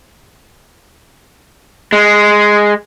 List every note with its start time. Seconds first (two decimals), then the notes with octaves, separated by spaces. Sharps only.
1.92 G#3